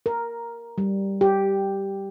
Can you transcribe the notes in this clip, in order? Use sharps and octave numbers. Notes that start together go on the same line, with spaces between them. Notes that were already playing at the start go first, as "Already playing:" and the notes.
A#4
G3
G4